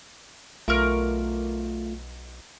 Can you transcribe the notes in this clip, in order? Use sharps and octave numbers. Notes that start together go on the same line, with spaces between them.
B1 A3 F4 A#4 C#6 D6